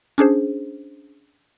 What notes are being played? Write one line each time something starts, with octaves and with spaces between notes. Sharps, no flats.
C#4 D4 G#4 C5